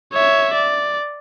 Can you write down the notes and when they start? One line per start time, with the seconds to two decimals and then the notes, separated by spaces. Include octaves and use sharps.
0.13 C#5 E5
0.54 D5